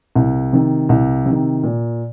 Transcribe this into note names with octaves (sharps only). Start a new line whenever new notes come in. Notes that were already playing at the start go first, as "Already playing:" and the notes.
C2
C3 D#3
C2
C3
D#3
A#2